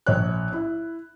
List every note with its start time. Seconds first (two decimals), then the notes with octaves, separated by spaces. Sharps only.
0.06 A#1 C#5 F#6
0.52 E4